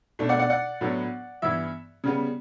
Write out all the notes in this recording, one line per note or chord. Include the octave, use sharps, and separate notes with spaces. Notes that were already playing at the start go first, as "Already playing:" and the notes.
B2 A3 D4
D5 F#5
D5 F#5
D5 F#5
A2 F#3 B3 D4
G2 E3 B3 E4 E5
C#3 G3 B3